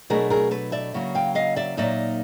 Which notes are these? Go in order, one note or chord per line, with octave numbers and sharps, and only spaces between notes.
B2 F#3 A3 D4 G#4 A#4
G#4 A#4
A4 B4
D5 E5
C#3 F#3 A#3
F5 G5
D#5 F5
D5 E5
A#2 F#3 A#3 D#4 D5 E5